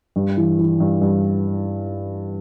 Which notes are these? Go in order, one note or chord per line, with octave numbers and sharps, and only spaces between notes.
G2
E3
E3
G2
G2